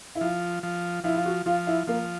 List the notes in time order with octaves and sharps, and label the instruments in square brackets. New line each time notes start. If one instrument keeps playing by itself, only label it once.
[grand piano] E4
[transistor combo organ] F3 [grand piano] F4
[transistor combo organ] F3
[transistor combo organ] F3 [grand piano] E4
[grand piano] F4
F#4
[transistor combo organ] F3 [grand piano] F4
[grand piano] E4
[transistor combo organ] F3 [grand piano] A#3